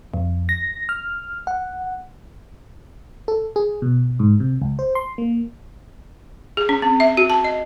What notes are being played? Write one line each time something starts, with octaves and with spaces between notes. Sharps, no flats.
F2
A#6
F6
F#5
A4
G#4
B2
G#2
C3
C#2
C5
C6
A#3
G#4
C#4
C4
E5
F#4
A5
D#5